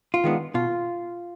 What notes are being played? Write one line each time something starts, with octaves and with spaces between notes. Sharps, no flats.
F4
D#3 G#3 B3 D4
B2 F4